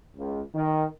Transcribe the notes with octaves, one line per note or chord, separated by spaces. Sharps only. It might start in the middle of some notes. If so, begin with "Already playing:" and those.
C#2
D#3